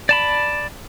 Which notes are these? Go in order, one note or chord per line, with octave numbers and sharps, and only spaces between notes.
D5 A5 B5